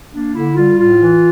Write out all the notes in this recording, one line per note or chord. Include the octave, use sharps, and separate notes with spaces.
A#3 D4
D3 E4
G3 F4
A2 F4
E3